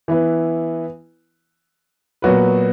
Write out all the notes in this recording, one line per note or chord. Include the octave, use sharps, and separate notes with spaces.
E3 B3 E4 B4
A#2 F#3 B3 F#4 B4